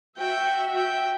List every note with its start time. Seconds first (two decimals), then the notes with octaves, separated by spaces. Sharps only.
0.17 F#4 E5 G5
0.76 G5